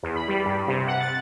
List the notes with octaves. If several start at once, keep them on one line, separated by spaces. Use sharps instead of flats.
E2
B5
G3
G2
C3
F#5
A6